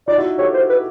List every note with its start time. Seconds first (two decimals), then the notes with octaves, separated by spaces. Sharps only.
0.08 D#4 F4 D5
0.18 E4 F#4
0.38 G4 A4 C#5
0.54 C5
0.69 B4